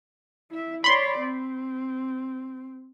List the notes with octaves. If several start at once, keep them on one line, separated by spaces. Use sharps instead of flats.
E4 E5
C#5 D5 B5 C6
C4